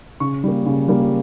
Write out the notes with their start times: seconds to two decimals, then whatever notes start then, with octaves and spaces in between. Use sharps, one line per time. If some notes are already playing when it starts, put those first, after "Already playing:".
0.20 C#3 C#6
0.44 G3 A#3
0.66 C#3
0.88 G3 A#3